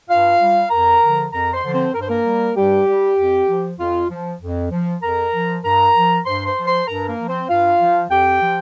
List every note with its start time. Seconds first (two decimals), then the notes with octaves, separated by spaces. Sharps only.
0.09 G2 F4 F5
0.40 G3
0.70 F2 A#4 A#5
1.02 D3 F3
1.32 F2 A#4 A#5
1.53 C5 C6
1.63 D3 F3
1.73 C4 C5
1.94 G2 A#4
2.01 C5
2.08 A#3 A#4
2.25 G3
2.56 G2 G3 G4
2.87 G3
3.18 F2
3.48 F3
3.79 F2 F4
4.10 F3
4.41 F2
4.71 F3
5.02 F2 A#4 A#5
5.33 F3
5.64 G2 A#4 A#5
5.95 F3
6.25 G2 C5 C6
6.46 C5 C6
6.56 F3
6.67 C5 C6
6.87 G2 A#4 A#5
7.08 A#3 A#4
7.18 F3
7.28 C4 C5
7.49 G2 F4 F5
7.80 F3
8.11 F2 G4 G5
8.41 F3